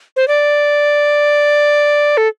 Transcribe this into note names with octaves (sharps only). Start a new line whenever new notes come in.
C5
D5
A4